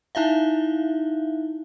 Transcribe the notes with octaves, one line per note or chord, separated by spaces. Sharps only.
D#4 E4 E5 F5